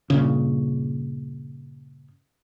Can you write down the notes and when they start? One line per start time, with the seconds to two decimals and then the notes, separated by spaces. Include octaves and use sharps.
0.10 G2 A#2 C#3